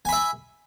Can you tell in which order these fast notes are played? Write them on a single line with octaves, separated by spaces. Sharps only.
G#5 B5 E5